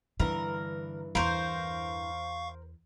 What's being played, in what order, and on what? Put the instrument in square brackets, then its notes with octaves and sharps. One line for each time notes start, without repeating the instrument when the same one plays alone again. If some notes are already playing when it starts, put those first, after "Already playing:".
[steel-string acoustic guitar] G2 E3 [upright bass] D3 [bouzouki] A#4
[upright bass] E2 [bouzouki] A#4 C5 [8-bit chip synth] F5 C#6